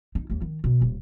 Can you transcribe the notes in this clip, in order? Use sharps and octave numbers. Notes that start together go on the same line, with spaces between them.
D#4
D#2 A#3
D#3
B2
D#1